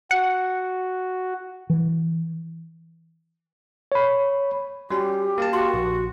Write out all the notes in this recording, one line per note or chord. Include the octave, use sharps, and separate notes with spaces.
F#4 F#5
E3
C#5 B5
G3 C#4 F#4 G4
A#3 F5 A5
F#4 C6
A#1